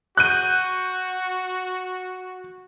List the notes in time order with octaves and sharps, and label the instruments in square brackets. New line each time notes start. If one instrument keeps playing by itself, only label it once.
[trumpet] F#4 [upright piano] F#6 G6 D#7